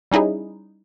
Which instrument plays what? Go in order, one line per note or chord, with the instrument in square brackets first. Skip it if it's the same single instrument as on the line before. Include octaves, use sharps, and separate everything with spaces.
[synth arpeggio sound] G3 C#4 D#4 E4 G#4